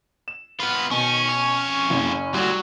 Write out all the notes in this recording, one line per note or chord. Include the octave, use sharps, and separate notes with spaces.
E7
B3 F4 B4
B2 D#3 C#4
F2 C#5
F#1 C#3
D2 F#3 G3 F#4